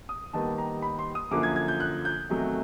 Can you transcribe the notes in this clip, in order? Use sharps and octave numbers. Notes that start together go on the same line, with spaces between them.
D#6
D#2 D#3 G3 B3 A5
A#5
B5
C6
D#6
F#2 D3 F3 A#3 D6
G#6
G#6
G6
F#6
G6
E2 C3 D#3 F#3 A3